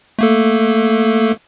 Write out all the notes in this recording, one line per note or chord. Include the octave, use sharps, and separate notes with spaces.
A3 A#3 A4